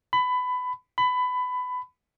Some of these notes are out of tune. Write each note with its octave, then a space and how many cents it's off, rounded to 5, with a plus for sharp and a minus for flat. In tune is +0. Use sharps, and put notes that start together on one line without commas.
B5 +20
B5 +20